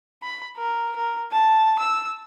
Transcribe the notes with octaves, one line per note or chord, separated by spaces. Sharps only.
B5
A#4
A#4
A5
E6